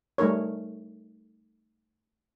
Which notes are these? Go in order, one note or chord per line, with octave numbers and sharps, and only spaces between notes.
G3 A3 D#4 A#4 C#5